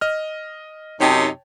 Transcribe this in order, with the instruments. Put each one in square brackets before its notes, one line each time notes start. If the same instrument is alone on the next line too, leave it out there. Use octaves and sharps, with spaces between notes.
[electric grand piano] D#5 F6
[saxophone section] F#2 C3 D#4 [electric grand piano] C#5 G5 A5